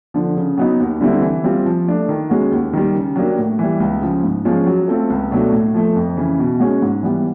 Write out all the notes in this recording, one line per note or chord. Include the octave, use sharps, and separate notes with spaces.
D3 F3
C#3
F#3 B3 D#4
D#2
D3 G3 C4 E4
E3
G3 C4 F4
F3
A3 D4
D#3
G#3 C#4 F#4
D#2
D#3 G3
C#3
F#3 A#3 D4 G4
A2
E3 G3
C#2
C#3 F3
G#2
F3 G#3 C#4 F4
F#3
A3 C4 F4 A4
C#2
B2 F#3 A3 D4
A2
F3 A3
F2
C#3 E3
B2
G#3 C#4 F#4
G#2
E3 G3 B3